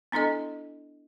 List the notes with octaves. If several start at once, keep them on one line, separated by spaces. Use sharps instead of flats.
B3 D4 E4 A4 D#5